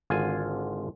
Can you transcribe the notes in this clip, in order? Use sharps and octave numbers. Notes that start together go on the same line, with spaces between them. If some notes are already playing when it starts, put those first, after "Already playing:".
G#1 D3 F4 G#5